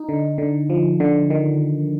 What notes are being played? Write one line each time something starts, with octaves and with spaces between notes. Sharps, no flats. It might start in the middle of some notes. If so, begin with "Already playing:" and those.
Already playing: D#4
D3
D3
F3
D3
D#3